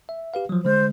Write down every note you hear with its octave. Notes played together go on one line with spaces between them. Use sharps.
E5
G4 B4 F5
F3 F#3
D3 G#3 C5